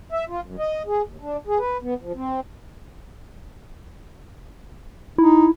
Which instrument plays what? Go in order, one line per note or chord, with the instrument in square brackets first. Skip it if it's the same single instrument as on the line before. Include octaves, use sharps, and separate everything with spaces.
[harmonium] E5
F4
F#2
D#5
G#4
D#2
D4
G#4
B4
B3
F3
C4
[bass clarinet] D#4 [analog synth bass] E4